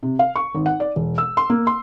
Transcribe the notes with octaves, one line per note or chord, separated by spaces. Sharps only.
C3
F5
C#6
G#1
F#5
D5
E1
E6
C6
A#3
C6